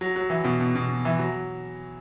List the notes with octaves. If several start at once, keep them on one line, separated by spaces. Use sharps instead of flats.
F#3
F#3
E3
B2
B2
B2
E3
F#3